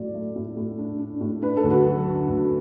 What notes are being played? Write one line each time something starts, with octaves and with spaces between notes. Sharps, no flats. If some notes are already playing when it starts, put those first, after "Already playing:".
Already playing: A2 F#3 D5
A3
A2
A2
D4
D4
A2
D4 B4
A4
D2
F#4 B4
F#3
D3
D2